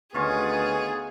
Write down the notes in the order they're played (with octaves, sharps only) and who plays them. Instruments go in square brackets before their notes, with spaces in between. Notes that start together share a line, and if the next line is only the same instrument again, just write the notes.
[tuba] D2 [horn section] D#3 B3 [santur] C#4 F4 C#6 [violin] G#4